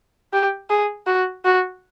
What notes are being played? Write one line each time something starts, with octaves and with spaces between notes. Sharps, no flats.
G4
G#4
F#4
F#4